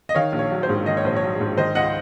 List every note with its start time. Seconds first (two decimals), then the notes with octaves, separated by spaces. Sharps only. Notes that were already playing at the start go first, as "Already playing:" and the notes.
0.09 D#5
0.15 D#3 C#5 F5
0.32 A#1
0.39 C#5
0.51 F#3
0.63 C5
0.69 G#2
0.86 D#3 D#5
0.97 C#5
1.04 A#1 C5
1.16 C#5
1.23 F#3
1.40 G#2
1.58 D#3 C5 D#5
1.75 C#2 D#5 F#5